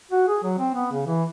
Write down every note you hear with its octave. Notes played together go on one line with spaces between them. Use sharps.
F#4
G#4
F#3
C4
B3
C#3
E3